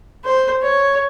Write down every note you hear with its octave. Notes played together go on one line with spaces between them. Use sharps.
C5
C#5